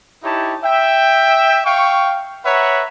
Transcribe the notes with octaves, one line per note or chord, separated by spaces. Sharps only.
D#4 E4 G4 C#5 A5
E5 G5
F5 G5 C#6
B4 C#5 E5 F#5 A#5